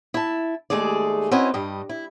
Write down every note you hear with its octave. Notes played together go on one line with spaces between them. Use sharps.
E4 A5
D#2 G#3 A3 G#4 D5
C4 C#4 E4 F#4 B4 D#5
G2 G3 D#5
E4